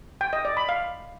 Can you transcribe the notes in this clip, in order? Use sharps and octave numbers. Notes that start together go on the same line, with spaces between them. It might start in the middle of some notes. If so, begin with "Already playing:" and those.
G5
D#5
D5
B5
F5